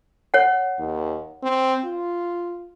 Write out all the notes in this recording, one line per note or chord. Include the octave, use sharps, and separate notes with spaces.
C#5 F#5
D#2
C4
F4